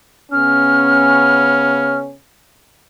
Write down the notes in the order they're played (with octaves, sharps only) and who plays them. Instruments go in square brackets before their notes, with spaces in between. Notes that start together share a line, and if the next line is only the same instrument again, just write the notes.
[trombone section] C#3 B3 C#4 [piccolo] F6